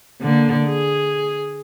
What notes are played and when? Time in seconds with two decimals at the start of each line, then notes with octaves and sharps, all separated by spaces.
0.21 D3 A#3
0.66 G#4